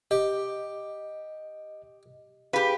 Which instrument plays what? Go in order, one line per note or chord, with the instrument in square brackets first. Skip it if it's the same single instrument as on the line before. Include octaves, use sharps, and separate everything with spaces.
[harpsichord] G4 [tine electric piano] D#5
[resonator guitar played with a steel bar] G4 B4 [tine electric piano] G#4 F5